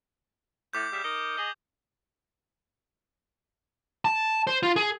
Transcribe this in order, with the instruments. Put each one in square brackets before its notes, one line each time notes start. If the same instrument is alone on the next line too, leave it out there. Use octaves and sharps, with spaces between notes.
[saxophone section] A2 [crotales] D6 G6
[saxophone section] C#3 G3 E5
D#4 A#4 D#5
G#4 D#5
[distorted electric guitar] A5
C5
F4
G#4